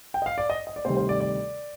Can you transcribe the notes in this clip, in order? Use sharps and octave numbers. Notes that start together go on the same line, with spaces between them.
G5
D#5
F5
D5
D#5
D#5
D5
D2 C3 D#3 G3 C5
C5
D5
D5